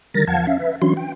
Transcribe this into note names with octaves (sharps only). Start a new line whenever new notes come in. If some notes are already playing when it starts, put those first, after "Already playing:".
D3 D#3 G3 A#4 A6 A#6
E2 F3 F5 F#5 A5 G#6
C#4 E5 F5
B4 E5
E3 F#3 C#4 D4 F#4 C6
G5